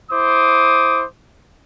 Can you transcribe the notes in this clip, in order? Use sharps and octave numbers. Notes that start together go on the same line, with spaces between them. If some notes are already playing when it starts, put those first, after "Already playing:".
E4 C5 D6 D#6